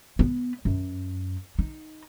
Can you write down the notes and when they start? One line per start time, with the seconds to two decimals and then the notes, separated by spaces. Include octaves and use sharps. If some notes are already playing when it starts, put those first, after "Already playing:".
0.19 B3
0.65 F#2
1.59 D#4